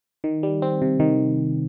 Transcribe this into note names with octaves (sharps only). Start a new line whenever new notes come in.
D#3
G3
C4
C3
D#3